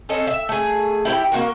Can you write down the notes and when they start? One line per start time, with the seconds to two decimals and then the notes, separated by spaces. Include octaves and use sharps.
0.09 C4 C#4 A4 D#5
0.27 E5
0.49 A3 G#4
1.05 E4 G4 B4 G5
1.32 A#3 C4 F#4 A#4